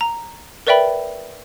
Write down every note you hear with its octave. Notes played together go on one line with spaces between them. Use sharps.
A#5
A#4 B4 D5 E5 G5 B5